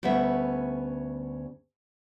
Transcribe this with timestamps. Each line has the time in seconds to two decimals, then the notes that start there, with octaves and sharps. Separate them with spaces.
0.03 D2 G3 B3 C#4 E5